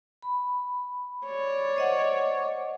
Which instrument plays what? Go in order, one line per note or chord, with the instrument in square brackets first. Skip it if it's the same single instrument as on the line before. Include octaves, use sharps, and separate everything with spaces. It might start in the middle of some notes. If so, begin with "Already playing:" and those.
[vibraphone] B5
[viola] C#5 D5
[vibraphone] C5 D#5 F#5